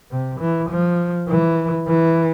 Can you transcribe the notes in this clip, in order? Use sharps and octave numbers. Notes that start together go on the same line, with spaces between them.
C3
E3
F3
E3
E3